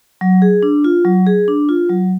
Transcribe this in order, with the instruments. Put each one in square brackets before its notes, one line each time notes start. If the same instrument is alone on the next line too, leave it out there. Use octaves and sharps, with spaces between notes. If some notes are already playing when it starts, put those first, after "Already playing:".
[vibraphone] F#3
G#4
D4
F4
F#3
G#4
D4
F4
F#3